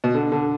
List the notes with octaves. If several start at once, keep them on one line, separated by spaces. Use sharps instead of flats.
B2
D3
D3